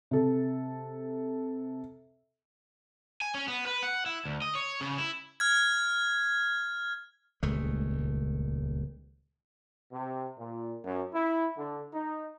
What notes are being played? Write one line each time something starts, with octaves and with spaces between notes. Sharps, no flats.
C3 A4
G#5
C#4
B3
B4
F#5
E4
D2
D#5
C#5
C#3
E4
F6 G#6
D#1 C#2 G#3 A3
C3
A#2
F#2
E4
D3
D#4